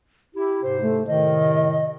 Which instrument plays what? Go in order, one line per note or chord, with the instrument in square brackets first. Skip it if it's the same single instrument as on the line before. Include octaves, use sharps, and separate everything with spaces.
[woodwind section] E4 [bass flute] G4
[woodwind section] G#2 C3 C5
[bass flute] A3
[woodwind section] A2 C3 D#3 [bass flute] D#5